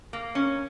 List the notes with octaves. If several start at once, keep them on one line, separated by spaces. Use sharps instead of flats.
A#3
C#4